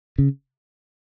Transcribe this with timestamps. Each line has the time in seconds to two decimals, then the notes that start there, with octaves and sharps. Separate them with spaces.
0.18 C#3